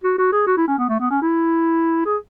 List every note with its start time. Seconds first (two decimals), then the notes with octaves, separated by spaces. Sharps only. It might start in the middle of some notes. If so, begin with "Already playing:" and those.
0.04 F#4
0.18 F#4
0.32 G#4
0.47 F#4
0.57 E4
0.68 C#4
0.79 B3
0.89 A3
1.00 B3
1.10 C#4
1.22 E4
2.05 G#4